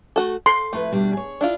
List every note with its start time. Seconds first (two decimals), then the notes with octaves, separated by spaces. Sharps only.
0.16 A3 F#4 A4
0.46 A4 C6
0.73 F2 A3 E4 B4
0.92 B2 G3 D4
1.13 G#4 C#5
1.41 D4 E4 F4